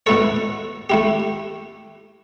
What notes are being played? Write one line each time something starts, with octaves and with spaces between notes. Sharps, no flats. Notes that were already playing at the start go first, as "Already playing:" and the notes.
B2 A3 E4 A4 C#5
A3 E4 G4